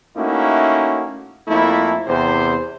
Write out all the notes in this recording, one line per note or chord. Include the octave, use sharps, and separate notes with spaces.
A3 A#3 C#4 D#4 E4 F#4
F2 A3 A#3 E4
E2 C3 C5